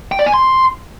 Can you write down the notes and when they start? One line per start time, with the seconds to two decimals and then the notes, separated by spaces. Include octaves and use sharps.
0.12 G5
0.19 D5
0.26 G#5
0.34 C6